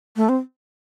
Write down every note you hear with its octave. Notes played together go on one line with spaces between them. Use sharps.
A3
C4